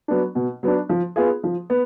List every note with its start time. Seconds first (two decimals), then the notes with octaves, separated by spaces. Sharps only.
0.08 F#3 B3 D4
0.35 B2
0.63 F#3 B3 D4
0.89 F3
1.16 B3 F4 G#4
1.44 F3
1.70 B3